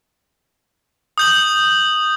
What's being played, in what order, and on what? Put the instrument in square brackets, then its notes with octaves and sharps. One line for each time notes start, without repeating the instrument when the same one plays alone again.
[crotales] D#6 G6 F#7